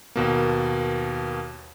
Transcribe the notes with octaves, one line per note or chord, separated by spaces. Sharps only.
D#2 B2 A#3